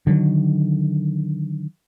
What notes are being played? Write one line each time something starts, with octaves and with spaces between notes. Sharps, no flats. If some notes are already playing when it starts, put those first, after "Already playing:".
D3 D#3 F#3